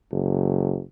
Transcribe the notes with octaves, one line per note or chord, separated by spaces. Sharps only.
F#1